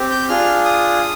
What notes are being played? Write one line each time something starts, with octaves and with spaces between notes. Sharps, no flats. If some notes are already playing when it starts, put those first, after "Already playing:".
Already playing: C4 G4
G6
D4 F4 G#4 F6
D#6